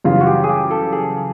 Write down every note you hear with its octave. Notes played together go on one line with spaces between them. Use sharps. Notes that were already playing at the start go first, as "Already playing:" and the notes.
F#2 C#3 E3 G3 F4
F#4
G4
G#4
G4
A4
G#4